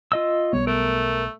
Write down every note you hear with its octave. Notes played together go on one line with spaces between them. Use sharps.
F4 D#5 E6
B1 G3 B3 C#5
A3 A#4